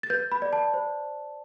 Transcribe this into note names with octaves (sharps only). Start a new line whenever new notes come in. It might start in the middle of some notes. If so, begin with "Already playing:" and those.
A6
B4 G6
B5
D5
A5
C5